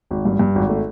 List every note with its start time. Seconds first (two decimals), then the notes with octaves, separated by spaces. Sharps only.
0.11 G#1
0.25 G2
0.39 G2
0.55 G#1
0.69 A3